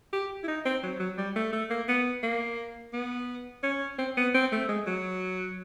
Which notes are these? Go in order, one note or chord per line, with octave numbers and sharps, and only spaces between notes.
G4
E4
D#4
C4
F#3
F#3
G3
A3
A3
A#3
B3
A#3
B3
C#4
C4
B3
C4
A3
G#3
F#3